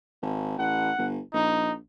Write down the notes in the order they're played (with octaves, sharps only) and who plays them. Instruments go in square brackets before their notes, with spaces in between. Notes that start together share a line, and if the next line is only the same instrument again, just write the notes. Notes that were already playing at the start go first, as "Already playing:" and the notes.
[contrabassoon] G#1
[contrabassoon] A1 [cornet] F#5
[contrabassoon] G1
[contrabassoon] A#1 [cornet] D#4